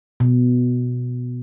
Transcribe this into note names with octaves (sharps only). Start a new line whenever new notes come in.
B2